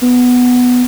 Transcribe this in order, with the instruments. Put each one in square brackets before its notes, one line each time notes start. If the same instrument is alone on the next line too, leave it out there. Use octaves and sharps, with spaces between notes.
[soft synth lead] B3